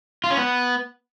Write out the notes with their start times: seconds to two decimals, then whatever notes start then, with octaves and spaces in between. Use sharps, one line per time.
0.24 F4
0.30 C#4
0.37 B3